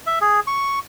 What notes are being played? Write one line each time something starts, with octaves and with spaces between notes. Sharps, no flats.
E5
G#4
C#6